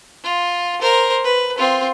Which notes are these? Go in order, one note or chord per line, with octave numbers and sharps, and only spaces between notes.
F4
A#4 C5
B4
C4 F4